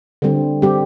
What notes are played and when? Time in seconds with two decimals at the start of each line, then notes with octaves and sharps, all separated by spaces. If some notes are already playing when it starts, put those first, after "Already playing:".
0.22 D3 G3 C4
0.62 G3 C4 G4